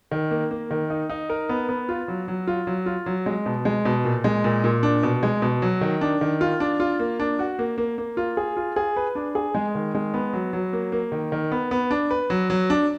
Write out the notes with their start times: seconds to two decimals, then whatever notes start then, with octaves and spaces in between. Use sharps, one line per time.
0.11 D#3
0.31 A#3
0.51 A#3
0.71 D#3
0.90 D#4
1.10 D#4
1.30 A#4
1.49 B3
1.69 B3
1.89 F4
2.08 F#3
2.28 F#3
2.48 F4
2.67 F#3
2.86 F4
3.06 F#3
3.26 G#3
3.46 B2
3.65 G#3
3.85 B2
4.04 A#2
4.24 G#3
4.44 A#2
4.64 A#2
4.83 D4
5.03 B2
5.23 G#3
5.42 B2
5.62 F#3
5.81 D#3
6.01 D4
6.21 D#3
6.41 F4
6.60 D4
6.80 F4
6.99 A#3
7.20 D4
7.39 F#4
7.59 A#3
7.78 A#3
7.98 A#3
8.17 F4
8.37 G#4
8.57 F4
8.76 G#4
8.97 B4
9.15 D4
9.35 G#4
9.55 G#3
9.75 D#3
9.95 G#3
10.14 B3
10.33 F#3
10.53 F#3
10.73 A#3
10.92 A#3
11.12 D#3
11.32 D#3
11.52 B3
11.71 B3
11.91 D4
12.11 B4
12.30 F#3
12.50 F#3
12.70 D4